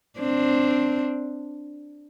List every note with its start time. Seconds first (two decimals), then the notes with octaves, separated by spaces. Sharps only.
0.20 C4 D4